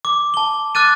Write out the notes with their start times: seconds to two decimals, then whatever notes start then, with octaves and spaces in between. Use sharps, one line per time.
0.05 D6
0.34 A5 G7
0.75 D6 F6 F#6 A6 D#7